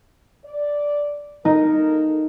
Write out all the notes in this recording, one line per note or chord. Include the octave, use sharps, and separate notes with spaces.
D5
A#3 D#4 A4 A#4